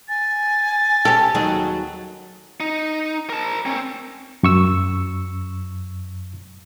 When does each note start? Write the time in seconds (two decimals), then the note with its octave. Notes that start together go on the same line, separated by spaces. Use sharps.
0.09 G#5 A6
1.05 C#4 G4 A4
1.35 D#2 F#3 G#4
2.60 D#4
3.29 A#4 A5
3.66 C4 C#4
4.43 F#2 C#6 E6